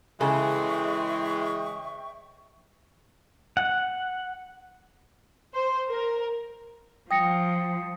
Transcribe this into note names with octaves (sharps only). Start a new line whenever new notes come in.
C#3 E3 G#3 G#4 A4 E5 G5 C#6
F#5
C5
A#4
F3 G5 D#6 A#6 C#7